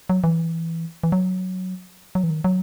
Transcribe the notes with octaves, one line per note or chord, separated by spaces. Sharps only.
F#3
E3
E3
F#3
F#3
E3
D#3
F#3